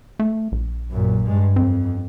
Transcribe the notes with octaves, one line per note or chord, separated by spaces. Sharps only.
A3
A#1
F#2 A#2
G2 G#3
F2 C4